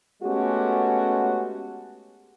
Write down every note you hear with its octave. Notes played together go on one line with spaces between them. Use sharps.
G#3 A3 B3 C#4 F#4 G4